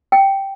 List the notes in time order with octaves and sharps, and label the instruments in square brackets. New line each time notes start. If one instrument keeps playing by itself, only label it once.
[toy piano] G5